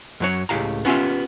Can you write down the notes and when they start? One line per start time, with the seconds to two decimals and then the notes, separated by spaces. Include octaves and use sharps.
0.20 F#2 F#3 C#5
0.49 C#2 A2 G4 F5 A#5
0.85 B3 C#4 F4 G4 E5